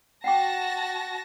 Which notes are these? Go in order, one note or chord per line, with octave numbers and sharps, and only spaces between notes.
F#4 F#5 G5 A5 D6 A#6